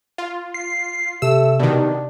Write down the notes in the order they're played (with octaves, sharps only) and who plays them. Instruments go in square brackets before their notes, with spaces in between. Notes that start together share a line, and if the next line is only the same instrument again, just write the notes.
[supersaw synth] F4
[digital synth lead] C7
[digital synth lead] C3 [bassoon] A3 [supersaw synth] E6
[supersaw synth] B2 D#3 [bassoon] D4